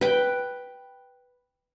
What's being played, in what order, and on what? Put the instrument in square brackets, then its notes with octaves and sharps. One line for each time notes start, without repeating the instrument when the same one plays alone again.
[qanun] B4 G5